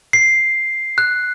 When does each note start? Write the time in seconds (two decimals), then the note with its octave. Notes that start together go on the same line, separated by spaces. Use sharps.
0.13 C7
0.98 F#6